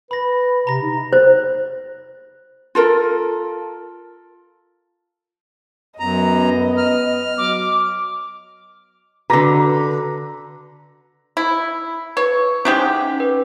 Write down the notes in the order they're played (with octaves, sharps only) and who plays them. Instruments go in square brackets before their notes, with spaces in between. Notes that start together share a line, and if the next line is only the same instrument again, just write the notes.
[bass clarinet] B4 [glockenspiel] B5 A#6
[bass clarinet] C3 [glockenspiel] A#5 A#6
[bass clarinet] D#4
[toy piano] C5
[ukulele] F4 A4 A#4
[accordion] F#2 A#5 [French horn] B3 [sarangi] D#5
[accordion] F6
[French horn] F#3 [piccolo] D6
[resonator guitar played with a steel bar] D3 B4 [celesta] F#4 D6 [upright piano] A#5 A#6
[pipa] E4
[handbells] B4 [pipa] C#5
[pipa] C3 G#3 G4 [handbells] C#4 D#4
[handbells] B4